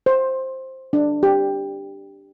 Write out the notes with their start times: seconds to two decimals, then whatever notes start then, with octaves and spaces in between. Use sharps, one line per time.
0.06 C5
0.93 D4
1.23 G4